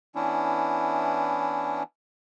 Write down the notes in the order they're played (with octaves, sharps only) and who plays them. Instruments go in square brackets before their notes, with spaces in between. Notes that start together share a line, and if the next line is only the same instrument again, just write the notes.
[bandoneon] E3 B3 C#4 D4 E4